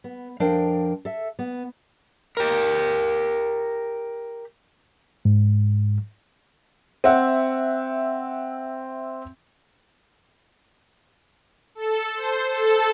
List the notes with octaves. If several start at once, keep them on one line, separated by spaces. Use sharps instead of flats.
B3
F2 F3 D4 A#4 F5 G5
A4 E5
B3
G4 A#4
G#2
C4 E5 F#5
A4
C5
A4